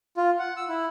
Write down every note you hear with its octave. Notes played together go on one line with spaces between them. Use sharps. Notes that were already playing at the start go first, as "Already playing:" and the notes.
F4
F#5
E6
E4